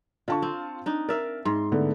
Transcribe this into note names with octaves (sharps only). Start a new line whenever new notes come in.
D3 F4 A5 C#6
C4
D4 D#4
A#4 D5 E5 F5
G#2 C6
D3 A3 B3